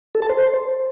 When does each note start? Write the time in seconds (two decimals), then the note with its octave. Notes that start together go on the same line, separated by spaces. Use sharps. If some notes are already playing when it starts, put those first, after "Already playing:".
0.15 A4
0.22 A5
0.29 C5